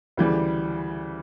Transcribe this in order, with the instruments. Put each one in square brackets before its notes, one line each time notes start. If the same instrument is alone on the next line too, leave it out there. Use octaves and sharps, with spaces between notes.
[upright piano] D2 C#3 E3 G3